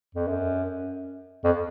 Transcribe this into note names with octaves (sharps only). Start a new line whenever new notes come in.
F2
F#2
F2